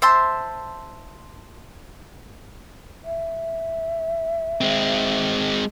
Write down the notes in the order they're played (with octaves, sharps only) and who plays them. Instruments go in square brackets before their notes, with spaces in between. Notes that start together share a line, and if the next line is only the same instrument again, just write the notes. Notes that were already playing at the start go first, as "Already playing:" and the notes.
[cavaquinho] C5 E5 A5 C6
[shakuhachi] E5
[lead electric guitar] G#3 C4